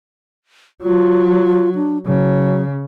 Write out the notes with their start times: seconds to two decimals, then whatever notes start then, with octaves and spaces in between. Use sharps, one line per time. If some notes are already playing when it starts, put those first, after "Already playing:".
0.82 F#3 F4
1.75 D4
2.06 C#3 F#3